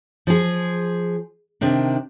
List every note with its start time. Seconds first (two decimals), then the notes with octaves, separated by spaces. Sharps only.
0.27 F3 G#4
1.61 C3 D#3 D4